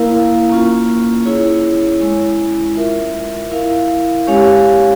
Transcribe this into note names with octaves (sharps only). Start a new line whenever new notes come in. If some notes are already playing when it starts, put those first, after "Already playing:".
Already playing: A#3 E4 A#4 F5
A#3 C#4 F4
C#4 E4 G#4 C#5
G#3 C#4 E4
F4 A#4 E5
E4 A#4 F5
G#3 C#4 G4 C#5 F5